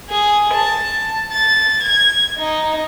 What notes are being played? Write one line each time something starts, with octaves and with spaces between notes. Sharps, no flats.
G#4
A5
A6
G#6
D#4